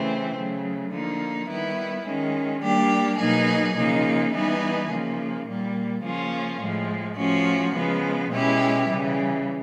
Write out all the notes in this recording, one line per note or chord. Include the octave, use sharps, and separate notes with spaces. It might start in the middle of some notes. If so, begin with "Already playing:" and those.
Already playing: C#3 E3 A3 C4
C#3 F#3 A3
D3 F3 A#3 D#4
D#3 G3 B3 E4
D#3 G#3 C#4
G3 A#3 D4 G4
B2 F#3 A#3 D#4 G#4
C#3 F3 A#3 D#4
E3 G3 B3 D#4 G#4
C#3 F3 A#3
A#2 G3 A#3
C#3 F3 A#3 C#4 F4
A2 F3 G#3
F3 A3 C#4 F#4
C#3 F3 G#3 B3
B2 G#3 C#4 E4 G4
C#3 E3 G3